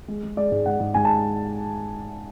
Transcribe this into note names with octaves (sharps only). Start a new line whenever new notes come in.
G#3
G#3
G#3 D5
G#2
G#2 F#5
G#2
G#2 G#5
A5